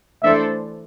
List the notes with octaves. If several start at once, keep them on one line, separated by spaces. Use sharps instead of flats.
E3 A3 D4 A4 C5 E5